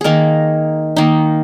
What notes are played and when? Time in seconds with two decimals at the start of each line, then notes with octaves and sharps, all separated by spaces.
0.01 D#3 A#3 D#4 G#4 A#4
0.96 D#3 A#3 D#4